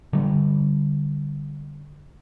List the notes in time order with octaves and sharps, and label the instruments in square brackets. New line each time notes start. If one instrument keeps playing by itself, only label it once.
[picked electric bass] D3 G3